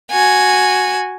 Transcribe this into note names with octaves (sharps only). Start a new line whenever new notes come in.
F#4 G#5